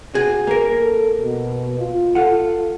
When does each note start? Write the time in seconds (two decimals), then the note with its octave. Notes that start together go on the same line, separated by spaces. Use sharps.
0.14 F#4 G#4
0.47 A#3 A#4
0.79 A4
1.17 B2
1.79 F4
2.15 F4 A4 F#5